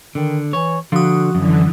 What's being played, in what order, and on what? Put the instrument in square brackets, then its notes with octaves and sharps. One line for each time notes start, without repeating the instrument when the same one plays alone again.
[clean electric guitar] D3 [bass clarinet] D#3
[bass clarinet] E3 [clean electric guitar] C#5
[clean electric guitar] D3 [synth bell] F3 D#6 [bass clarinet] F#4
[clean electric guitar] F#2 [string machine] D3 E3